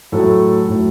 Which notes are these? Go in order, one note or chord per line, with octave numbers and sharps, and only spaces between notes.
A2 F#3 A3 A4
A2 F#3 A3